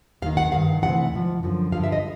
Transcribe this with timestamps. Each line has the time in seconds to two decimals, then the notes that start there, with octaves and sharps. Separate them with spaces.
0.22 D#2 F5
0.26 D#3
0.37 F#5
0.52 G2 D#3 F5
0.82 D2 C3 E3 F#5
1.13 G#2 F3
1.43 F#2 D3 F3
1.72 G2 D3 F3 F5
1.84 E5
1.92 D#5